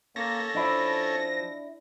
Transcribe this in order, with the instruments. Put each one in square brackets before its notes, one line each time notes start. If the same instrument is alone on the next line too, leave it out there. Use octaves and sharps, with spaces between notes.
[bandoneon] A#3 [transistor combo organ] C#4 A4 [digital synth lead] A#6
[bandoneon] F3 [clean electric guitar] D4 E4